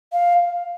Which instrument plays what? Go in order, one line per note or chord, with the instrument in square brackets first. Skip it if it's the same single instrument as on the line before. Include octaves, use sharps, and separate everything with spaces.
[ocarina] F5